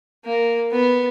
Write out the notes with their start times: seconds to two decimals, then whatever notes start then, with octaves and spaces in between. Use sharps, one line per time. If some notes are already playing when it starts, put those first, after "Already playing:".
0.25 A#3
0.72 B3